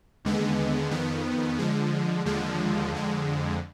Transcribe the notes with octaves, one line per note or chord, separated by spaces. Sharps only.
D#2 D3 G#3 B3
F2 D#3 B3
D3 F3 G#3
D#2 D3 F3 G#3
F2 D3 G#3